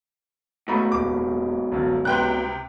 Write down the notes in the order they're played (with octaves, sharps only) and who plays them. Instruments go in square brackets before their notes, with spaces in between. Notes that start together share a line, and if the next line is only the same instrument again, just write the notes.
[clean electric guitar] G#2 B2 [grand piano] A3 A#5 B5
[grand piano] D#1 D6
G1 F#2
[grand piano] C#2 B4 C6 [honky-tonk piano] C3 G5 F#6